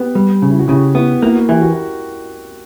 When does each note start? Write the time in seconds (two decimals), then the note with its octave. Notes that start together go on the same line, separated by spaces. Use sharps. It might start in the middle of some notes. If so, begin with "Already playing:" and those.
Already playing: B3 G4 B4
0.15 G3
0.42 C#3
0.49 E4
0.59 F#4
0.68 C#3 E4 G4
0.95 B3 E4
1.22 A#3 E4
1.35 F#4
1.48 E3 E4 G4
1.62 F#4 A#4